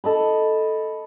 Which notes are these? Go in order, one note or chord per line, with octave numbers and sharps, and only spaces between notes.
A4 D#5 B5